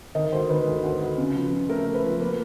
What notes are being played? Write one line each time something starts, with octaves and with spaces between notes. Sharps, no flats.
D#3 D#5
D2 C5
D#3 B4
D2
D2
D2
C#3
F3
C#3
A3 A#4
A3
B4
F3
A#3 B4